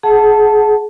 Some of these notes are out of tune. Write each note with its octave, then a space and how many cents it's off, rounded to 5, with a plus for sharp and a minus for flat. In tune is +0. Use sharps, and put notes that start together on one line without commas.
G#4 +25 F#5 +0 A5 +0